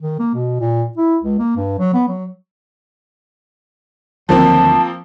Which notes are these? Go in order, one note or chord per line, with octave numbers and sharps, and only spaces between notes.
D#3
A#3
B2
A#2
E4
C#2
A#3
G2
F#3
B3
F#3
D2 D#3 F3 F#3 A#3 C4 A5